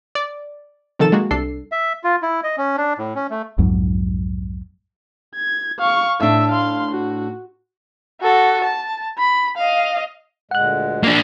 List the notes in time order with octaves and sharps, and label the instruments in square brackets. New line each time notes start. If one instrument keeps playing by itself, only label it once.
[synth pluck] D5
C3 D#3 F3 A4 A6 E7
G#3 A#3 F#4
C2 D4 A4 C7
[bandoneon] E5
F4
E4
D#5
C#4
D4
A2
C#4
A3
[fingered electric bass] B1 F2 G#2 F#3
[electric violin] G#6
F5 C#6
[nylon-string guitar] A2 D4 [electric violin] E5
[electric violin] F5 C6
F#4
[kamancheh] F#4 A4
A5
B5
D#5 F5
[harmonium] D2 A#2 G#3 [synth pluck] F#5 F#6
[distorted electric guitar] A#3 D4